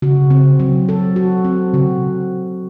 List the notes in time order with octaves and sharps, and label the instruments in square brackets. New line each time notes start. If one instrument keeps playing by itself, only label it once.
[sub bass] C#3 [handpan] F#4
[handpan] C4
F#3
A4
F#4
C4
[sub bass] C#3 [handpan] F#4